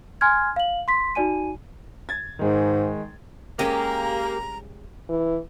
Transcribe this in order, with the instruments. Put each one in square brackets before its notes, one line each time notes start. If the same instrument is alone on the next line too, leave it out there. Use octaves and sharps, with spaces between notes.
[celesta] G#5 C6 F6 G#6
F5 F#7
C6 B6
D#4 F#4 D5 G#5 D#7
[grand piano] G#6 A6
[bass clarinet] G#2 [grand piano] D#3 G#3
[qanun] G#3 C#4 D#5 [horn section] A#3 [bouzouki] G4 [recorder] A#5
[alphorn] E3